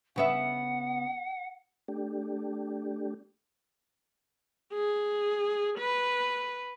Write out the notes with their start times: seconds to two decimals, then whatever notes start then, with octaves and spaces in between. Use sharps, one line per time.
0.16 C#3 B3 E5 F#5
1.88 A3 D4 G4
4.74 G#4
5.79 B4